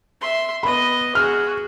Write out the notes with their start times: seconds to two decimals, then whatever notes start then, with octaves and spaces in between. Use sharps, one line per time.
0.21 E5 C6
0.63 B3 D#5 B5
1.15 F#4 G#4 F6